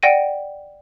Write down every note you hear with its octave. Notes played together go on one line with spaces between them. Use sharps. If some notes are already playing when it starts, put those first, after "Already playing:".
D5 F#5 G5 A#6 D7 D#7